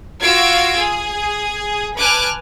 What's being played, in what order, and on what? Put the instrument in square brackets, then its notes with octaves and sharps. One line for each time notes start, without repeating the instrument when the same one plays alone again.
[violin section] F4 F#4 F5 E6 G#6 D7
G#4
B4 G#5 A5 D6 F6 F#6